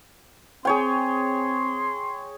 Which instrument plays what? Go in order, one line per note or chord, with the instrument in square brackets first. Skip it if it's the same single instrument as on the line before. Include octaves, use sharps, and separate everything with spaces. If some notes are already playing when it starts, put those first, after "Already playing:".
[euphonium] C4 [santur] G#4 C#5 G5 [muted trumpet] C6